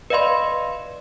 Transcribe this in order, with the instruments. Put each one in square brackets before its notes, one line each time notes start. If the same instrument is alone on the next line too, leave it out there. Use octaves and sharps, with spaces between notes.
[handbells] B4 D5 D#5 F5 B5 C6